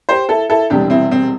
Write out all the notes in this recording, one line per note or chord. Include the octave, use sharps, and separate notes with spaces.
G4 C5
E4 A4
E4 A4
E1 E2 C3 G3 D4 G4
C4 E4
C4